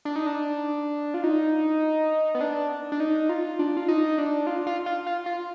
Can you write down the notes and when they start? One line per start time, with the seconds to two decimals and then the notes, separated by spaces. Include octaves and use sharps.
0.05 D4
0.16 D#4
0.27 D4
1.14 F4
1.24 D#4
2.35 B3
2.41 D4
2.92 D4
3.00 D#4
3.29 F4
3.59 D4
3.77 F4
3.88 D#4
4.18 D4
4.47 F4
4.67 F4
4.86 F4
5.07 F4
5.26 F4